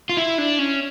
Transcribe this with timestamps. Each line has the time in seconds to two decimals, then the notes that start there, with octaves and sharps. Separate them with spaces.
0.09 F4
0.17 E4
0.38 D4
0.59 C#4